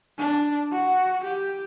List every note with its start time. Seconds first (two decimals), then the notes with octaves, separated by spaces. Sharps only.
0.19 D4
0.72 F#4
1.24 G4